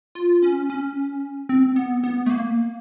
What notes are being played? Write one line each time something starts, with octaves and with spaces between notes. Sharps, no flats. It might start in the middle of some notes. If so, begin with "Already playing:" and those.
F4
C#4
C#4
C4
B3
B3
A3
A#3